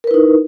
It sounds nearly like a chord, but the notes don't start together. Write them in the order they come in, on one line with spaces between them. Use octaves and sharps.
A#4 B4 E4 D#4